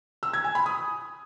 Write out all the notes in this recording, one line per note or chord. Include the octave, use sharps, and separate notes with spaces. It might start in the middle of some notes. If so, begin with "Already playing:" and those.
E6
G#6
G#5
B5
D#6